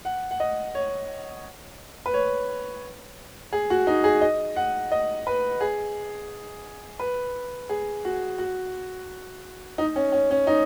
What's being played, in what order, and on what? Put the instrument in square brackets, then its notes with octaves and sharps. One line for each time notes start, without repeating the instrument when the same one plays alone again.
[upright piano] F#5
F#5
D#5
C#5
B4
C#5
G#4
F#4
D#4
G#4
D#5
F#5
D#5
B4
G#4
B4
G#4
F#4
F#4
D#4
C#4
C#4
C#4
D#4